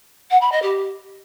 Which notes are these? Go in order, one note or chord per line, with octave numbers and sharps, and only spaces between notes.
F#5
B5
D#5
G4